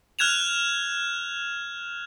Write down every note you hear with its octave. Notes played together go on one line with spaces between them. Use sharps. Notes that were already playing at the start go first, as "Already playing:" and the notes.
F6 F#6 G#6 E7 F7